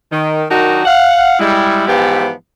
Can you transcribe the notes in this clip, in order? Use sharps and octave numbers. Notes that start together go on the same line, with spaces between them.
D#3
D#3 F#3 D4 D#4 F#4 A#4
F5 F#5
G3 G#3 E4
G#2 E3 F3 B3 G4